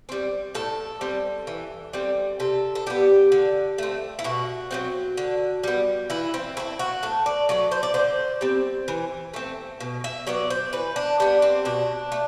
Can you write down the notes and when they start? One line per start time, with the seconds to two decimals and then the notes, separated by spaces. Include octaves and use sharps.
0.09 G3 C4
0.55 A2 A4
1.01 G3 C4
1.47 E3
1.93 G3 C4
2.40 C3 A4
2.75 A4
2.87 G3 B3 G4
3.32 D3
3.78 A3 C4
4.19 E4
4.24 B2 F#4
4.71 F#3 A3 C4
5.17 D3
5.63 G3 B3
6.10 E3 E4
6.34 C4
6.57 A3 C4 E4
6.79 F#4
7.03 A2 A4
7.26 D5
7.49 F#3 A3 D5
7.71 C5
7.83 D5
7.94 D3 C5
8.41 G3 C4
8.88 E3
9.34 A3 C4
9.80 B2
10.04 E5
10.27 F#3 B3 D5
10.50 C5
10.73 E3 B4
10.96 D4
11.20 G3 B3 D4
11.42 C4
11.65 B2 D4
12.12 A3